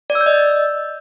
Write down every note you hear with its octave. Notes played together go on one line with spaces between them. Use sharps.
D5
E6
G6
D#5